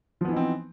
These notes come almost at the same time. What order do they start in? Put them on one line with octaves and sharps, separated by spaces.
F3 B3 E3 D#4 C4